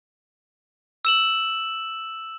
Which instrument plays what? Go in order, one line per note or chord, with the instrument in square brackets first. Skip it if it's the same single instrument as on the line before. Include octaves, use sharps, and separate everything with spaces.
[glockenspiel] E6 E7 F#7